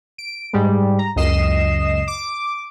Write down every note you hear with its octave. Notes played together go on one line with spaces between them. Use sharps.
D7
G#2 G3 G#3
A#5
C#2 F#2 D#5 C7 E7
D6